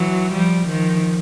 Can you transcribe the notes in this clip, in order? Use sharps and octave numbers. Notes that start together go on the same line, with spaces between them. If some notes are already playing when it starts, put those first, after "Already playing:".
Already playing: E3 F#3
F3 G3
D#3 F3